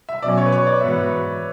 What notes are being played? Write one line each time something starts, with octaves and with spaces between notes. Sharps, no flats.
E5
B2 F#3 C#4 D5
C#5
B4
C#5
D5
G#2 E3 B3 F#4 B4 E5